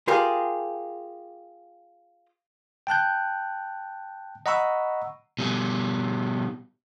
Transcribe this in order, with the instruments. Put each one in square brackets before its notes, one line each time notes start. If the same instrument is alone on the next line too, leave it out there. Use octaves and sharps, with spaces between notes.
[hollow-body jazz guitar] F4 G4 G#4 A#4
[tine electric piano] G5 A5 F#6 G6
D#5 F#5 A#5 B5 C#6 E6
[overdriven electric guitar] B2 G3